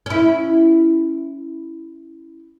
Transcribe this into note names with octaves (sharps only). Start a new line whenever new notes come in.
C#4 E4